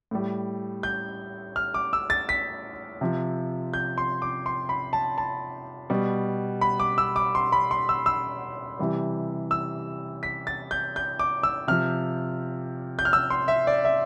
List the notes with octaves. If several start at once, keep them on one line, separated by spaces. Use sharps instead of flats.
A2 G3
G6
F6
D6
E6
A6
B6
C3 F3
G6
C6
D6
C6
B5
A5
A5
B2 G3
B5
D6
E6
D6
C6
B5
C6
E6
E6
C3 E3 G3
E6
B6
A6
G6
G6
D6
E6
C3 F3 F6
G6
F6
E6
C6
E5
D5
E5